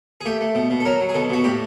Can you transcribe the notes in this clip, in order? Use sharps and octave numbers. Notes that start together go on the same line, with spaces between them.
G#4
A3 G4
A3
B2
B2
A4
F#3 A#4
F#3
G#4
B2 A4
B2 F#4
A2 G4